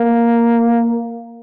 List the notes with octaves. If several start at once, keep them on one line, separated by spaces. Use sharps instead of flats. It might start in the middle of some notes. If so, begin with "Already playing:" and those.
Already playing: A#3